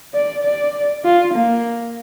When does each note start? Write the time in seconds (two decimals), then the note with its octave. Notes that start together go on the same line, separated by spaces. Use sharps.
0.14 D5
0.44 D5
1.04 F4
1.34 A#3